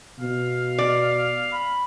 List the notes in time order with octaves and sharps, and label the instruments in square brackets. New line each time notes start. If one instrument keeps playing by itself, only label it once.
[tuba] B2 [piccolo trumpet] F5
[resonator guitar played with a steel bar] D5
[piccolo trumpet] B5